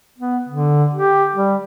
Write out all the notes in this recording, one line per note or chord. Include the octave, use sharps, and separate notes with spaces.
B3
D3
G4
G3